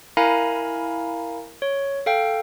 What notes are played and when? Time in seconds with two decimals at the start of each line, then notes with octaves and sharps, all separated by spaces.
0.17 E4 A#4 F5 G#5 A#5 B5
1.62 C#5
2.06 A4 F5 G5